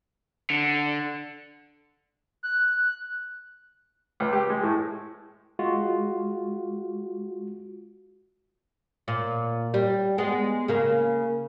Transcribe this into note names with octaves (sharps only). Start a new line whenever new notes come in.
D3
F#6
C#2
G4
G#3
A2
G#3 F4 F#4
A#2
G3
G#3 B3
C#3 A#3